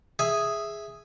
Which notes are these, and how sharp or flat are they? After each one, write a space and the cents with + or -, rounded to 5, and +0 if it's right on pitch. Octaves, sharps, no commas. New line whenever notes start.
G#4 +0 E5 +0 G#5 +0